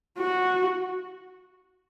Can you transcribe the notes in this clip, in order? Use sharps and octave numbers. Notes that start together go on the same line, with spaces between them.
F#4